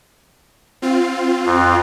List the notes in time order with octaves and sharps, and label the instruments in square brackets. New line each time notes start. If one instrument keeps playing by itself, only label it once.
[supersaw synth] C4 F4
[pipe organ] F2